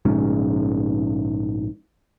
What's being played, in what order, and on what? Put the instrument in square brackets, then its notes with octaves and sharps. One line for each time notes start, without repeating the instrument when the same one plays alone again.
[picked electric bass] A#1 G#2 C#3 C#4